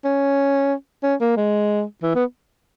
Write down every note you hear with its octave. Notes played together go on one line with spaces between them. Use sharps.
C#4
C#4
A#3
G#3
E3
B3